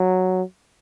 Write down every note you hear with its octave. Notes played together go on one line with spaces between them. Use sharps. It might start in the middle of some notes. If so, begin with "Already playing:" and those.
Already playing: F#3